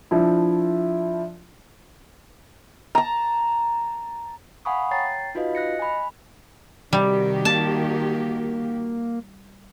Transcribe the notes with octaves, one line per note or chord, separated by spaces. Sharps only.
F3 D4 E4
A5 A#5
F5 F#5 G#5 B5 C#6 D#6
C#5 G5 A#5 A6 C7
D#4 F4 F#4 B4 D#5 F5
D#5 F#6 A#6 C#7
G#5 B5
C3 D#3 G3 F#4 G4
A#3 A5